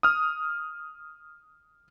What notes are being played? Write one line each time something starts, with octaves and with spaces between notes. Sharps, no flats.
D#6 F6